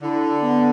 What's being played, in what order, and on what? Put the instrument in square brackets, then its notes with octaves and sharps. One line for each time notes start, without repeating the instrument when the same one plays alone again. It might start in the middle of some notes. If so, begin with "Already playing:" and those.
[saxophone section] D3 [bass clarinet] E4
[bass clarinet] B3